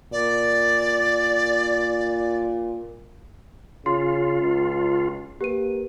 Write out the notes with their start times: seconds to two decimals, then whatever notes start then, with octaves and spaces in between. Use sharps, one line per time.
0.12 A#2 D5
3.86 C#3 F4 C6
4.41 C#2
5.41 A#3 G4 B4 D#7